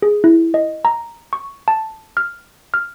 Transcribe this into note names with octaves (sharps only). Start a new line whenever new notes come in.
G#4
E4
D#5
A#5
C#6
A5
F6
F6